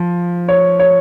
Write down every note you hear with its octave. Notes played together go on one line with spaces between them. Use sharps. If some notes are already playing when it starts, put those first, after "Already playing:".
Already playing: F3
C#5
C#5